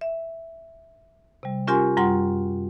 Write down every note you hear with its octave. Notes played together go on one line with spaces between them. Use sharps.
E5
C3 G3
C#4 F4 G4 A#4 G#5 C6
F#2 G3 F4 F#5 C6